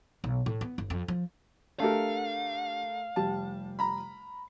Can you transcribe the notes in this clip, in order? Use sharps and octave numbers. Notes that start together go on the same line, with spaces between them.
B1
A2
B3
G1
F2
F3
A3 D4 G4 A4 A#4 F5
F1 G3 G4 A5
A#5 B5